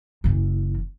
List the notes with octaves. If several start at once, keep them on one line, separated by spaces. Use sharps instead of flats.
F#1 E3